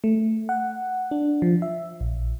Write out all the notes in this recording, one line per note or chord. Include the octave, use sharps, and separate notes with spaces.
A3
F#5
D4
F3
E5
A#1